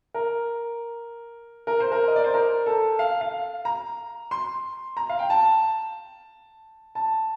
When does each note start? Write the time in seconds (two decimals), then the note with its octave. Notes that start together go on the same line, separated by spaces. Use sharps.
0.14 A#4
1.67 A#4
1.80 C5
1.92 A#4
2.08 D#5
2.16 D5
2.24 C5
2.34 A#4
2.66 A4
2.99 F5
3.21 F5
3.65 A#5
4.31 C6
4.97 A#5
5.09 F5
5.19 G5
5.30 A5
6.95 A5